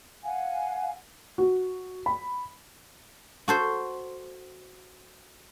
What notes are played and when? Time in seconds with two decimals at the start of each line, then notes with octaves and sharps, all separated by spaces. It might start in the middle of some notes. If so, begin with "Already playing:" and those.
0.24 F5 F#5 G#5
1.38 F#4
2.06 B5
3.48 F#4 A4 C5